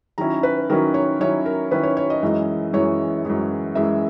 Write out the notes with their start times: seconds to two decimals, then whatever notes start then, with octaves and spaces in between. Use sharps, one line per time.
0.18 D#3 F#3 C#4 E4 A#5
0.43 B4
0.70 D#3 F#3 C#4 E4 A#4
0.94 C#5
1.20 D#3 F#3 C#4 E4 C#5
1.46 A#4
1.71 D#3 F#3 C#4 E4 B4
1.83 C#5
1.97 C#5
2.10 D#5
2.22 F#2 E3 G#3
2.73 F#2 E3 G#3 C#5
3.25 F#2 E3 G#3
3.75 F#2 E3 G#3 E5